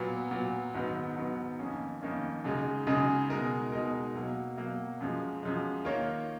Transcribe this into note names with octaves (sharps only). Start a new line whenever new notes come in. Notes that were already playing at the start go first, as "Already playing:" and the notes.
Already playing: A#2 F#3 B3
A#2 F#3 B3
G#2 D#3 F#3 B3
G#2 D#3 F#3 B3
F2 D#3 A#3 C#4
F2 D#3 A#3 C#4
F#2 C#3 G#3 D#4 G#4
F#2 C#3 G#3 D#4 G#4
B2 G#3 D#4 A#4
B2 G#3 D#4 A#4
B2 F#3 A#3
B2 F#3 A#3
F#2 F3 G#3
F#2 F3 G#3
D#3 A#3 F4 A#4 C#5